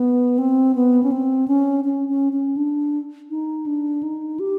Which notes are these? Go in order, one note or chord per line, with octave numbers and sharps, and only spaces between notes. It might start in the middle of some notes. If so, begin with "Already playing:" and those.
Already playing: B3
C4
B3
C#4
C4
C#4
C#4
C#4
C#4
D4
D#4
D4
D#4
G4